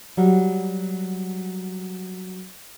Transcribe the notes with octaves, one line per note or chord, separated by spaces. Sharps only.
F#3 G3